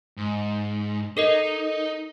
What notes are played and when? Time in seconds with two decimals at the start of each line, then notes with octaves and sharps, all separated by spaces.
0.17 G#2
1.17 D#4 A4 A#4 D#5